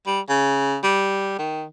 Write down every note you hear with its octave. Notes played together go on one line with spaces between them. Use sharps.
G3
C#3
G3
D#3